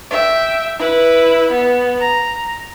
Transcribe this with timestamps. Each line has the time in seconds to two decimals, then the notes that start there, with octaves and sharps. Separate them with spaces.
0.10 E5 G5
0.79 E4 B4
1.51 B3
2.00 A#5